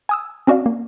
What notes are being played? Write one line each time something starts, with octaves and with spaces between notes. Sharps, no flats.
G#5 D#6 E6
C4 C#4 F#4 D5 F5
A#3